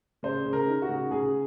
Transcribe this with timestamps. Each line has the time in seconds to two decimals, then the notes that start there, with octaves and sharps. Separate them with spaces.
0.23 C#3 C5
0.46 C#3
0.53 A#4
0.67 D#4
0.82 F#4
0.89 C#3
1.11 C#3 G#4